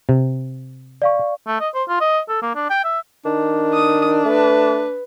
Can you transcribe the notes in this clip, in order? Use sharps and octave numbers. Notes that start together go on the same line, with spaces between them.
C3
D5 F5 C#6
A3
D#5
C5
F4
D#5
A4
A#3
D4
G5
E5
D#3 D4
D#6
A3 B4